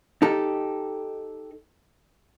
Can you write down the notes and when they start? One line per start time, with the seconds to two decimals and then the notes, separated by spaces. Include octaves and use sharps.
0.22 D#4 G4 A4